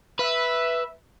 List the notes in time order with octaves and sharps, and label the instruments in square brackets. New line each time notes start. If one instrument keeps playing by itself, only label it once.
[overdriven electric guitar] B4 [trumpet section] E5